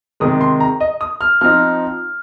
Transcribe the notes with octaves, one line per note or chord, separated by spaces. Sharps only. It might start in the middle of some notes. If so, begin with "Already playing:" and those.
C3 D#3 G#3 D#6
C6
A#5
D#5
D#6
F6
F3 C4 D#4 F6